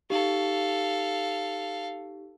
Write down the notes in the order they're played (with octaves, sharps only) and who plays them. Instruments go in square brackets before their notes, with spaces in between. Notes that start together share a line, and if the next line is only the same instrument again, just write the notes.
[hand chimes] D#4 G4 [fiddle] A4 F5